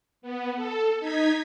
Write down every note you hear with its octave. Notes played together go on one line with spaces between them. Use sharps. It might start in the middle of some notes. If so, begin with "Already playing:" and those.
B3
A4
D#4 G#6 B6